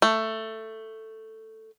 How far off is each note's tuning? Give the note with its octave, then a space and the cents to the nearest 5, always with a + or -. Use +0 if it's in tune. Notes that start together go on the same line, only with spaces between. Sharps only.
A3 +10